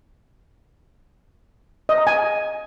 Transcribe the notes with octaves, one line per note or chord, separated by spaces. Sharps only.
D#5
A#5
G#5